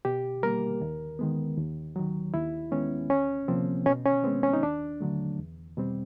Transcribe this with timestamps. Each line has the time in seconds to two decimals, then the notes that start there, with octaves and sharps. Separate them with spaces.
0.05 B2 G4
0.43 G3 A#3 A#4
0.81 D#2
1.19 D#3 G#3 B3
1.58 D#2
1.96 D#3 F#3
2.34 D#2 E4
2.72 D#3 G#3 B3 C#4
3.10 D2 C#4
3.48 C3 F3 A#3 C4
3.86 B2 C#4
4.06 C#4
4.24 G#3 B3 C4
4.43 C#4
4.53 D#4
4.63 D#2 D4
5.00 D3 F#3 A3
5.39 E2
5.77 B2 G3 C4